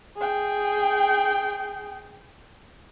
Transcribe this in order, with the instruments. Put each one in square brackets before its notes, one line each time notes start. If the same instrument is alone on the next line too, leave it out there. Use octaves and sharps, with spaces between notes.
[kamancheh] G#4 G5